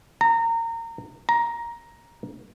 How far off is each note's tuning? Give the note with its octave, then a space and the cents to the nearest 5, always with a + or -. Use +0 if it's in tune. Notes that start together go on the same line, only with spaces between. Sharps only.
A#5 -25
A#5 +10